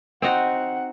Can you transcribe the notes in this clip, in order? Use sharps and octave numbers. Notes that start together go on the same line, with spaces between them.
C4 D#4 F#4 F#5